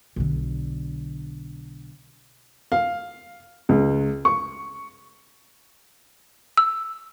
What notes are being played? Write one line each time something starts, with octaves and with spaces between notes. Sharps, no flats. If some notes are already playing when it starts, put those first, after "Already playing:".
B1 D3
F5
C#2
C#6
E6